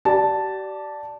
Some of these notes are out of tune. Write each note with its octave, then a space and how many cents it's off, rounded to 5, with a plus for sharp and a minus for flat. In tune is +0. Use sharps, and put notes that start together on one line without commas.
G4 -40 D5 +0 A5 +0